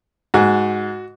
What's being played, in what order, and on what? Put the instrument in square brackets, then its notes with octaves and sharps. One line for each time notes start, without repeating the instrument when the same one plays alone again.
[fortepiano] G#2 [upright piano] F#4